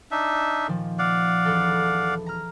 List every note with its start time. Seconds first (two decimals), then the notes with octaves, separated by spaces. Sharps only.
0.11 D4 D#4 E5
0.68 A#2 D#3 F3
0.99 D5 F5 F#5
1.45 E1 E3 A4
2.26 A#5 F6